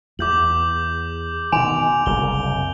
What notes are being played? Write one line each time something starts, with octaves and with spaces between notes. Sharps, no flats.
E2 D6 G6 F#7
B2 D#3 G#5 D7 F7
F#1 C2 G7